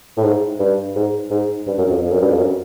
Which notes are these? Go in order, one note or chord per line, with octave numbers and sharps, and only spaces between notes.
A2
G#2
G2
G#2
G#2
G2
F#2
F2
F2
F#2
G2
F2
F#2